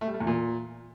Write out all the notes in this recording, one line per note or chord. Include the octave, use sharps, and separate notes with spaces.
A3
G3
A3
E2
A#2